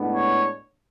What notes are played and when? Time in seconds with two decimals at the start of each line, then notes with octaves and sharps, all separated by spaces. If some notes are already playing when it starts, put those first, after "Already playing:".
Already playing: A2 G#3 B3 D4
0.15 C#5